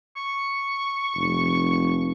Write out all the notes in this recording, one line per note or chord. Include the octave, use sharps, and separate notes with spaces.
C#6
F1